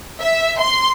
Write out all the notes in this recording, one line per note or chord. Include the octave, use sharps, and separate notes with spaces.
E5
C6